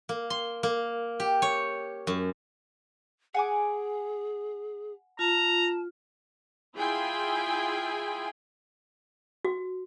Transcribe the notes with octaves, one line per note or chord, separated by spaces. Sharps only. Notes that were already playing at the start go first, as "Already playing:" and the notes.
A#3
C6
A#3
G4
C#5
F#2
G#4 F#5 G#5 D6
F4 A5 A#5
E4 F4 G#4 G5 G#5 C6
F#4